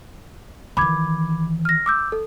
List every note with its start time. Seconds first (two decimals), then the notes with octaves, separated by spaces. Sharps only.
0.77 D#3 E3 B5 D6 G#6
1.65 F6 A#6
1.86 D6 E6 G6
2.12 A4